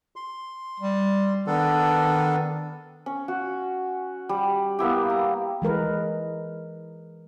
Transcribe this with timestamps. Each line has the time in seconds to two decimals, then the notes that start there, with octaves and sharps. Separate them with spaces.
0.16 C6
0.80 G3
1.47 D#3 B3 D4 A4
3.06 C#4
3.28 F#4
4.29 G3
4.79 A#3 B3 E4 G4
5.10 A#5
5.62 E3 G#3 A#4 B4